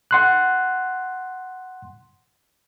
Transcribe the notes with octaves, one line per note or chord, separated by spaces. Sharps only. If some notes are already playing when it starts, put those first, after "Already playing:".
F#5 C6 F#6